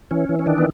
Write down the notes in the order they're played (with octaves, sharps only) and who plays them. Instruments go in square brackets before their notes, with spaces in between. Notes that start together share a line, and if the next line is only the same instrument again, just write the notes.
[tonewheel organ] E3 C#4
E3
C#4
D#3 D4
B3